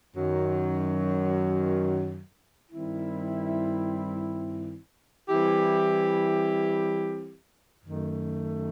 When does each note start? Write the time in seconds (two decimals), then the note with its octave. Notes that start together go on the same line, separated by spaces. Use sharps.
0.15 F#2 D#3 F#3
2.72 G2 D#3 G3 C4 E4
5.29 E3 G3 C4 E4 G4
7.86 F#2 D#3 A3